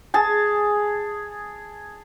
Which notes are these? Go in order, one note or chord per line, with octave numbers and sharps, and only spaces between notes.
G#4 A5